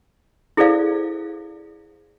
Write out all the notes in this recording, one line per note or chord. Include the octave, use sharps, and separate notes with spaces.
E4 G#4 A4 C5 D5 F5